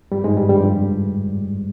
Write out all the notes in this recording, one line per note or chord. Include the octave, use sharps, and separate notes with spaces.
G2 G3
G#2 G#3
G2 G3
G2 G3
F2 F3